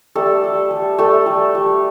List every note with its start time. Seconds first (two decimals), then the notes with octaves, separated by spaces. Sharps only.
0.15 G3 A3 A4
0.44 G3
0.71 G3
0.98 G3 A3 A4
1.26 G3
1.55 G3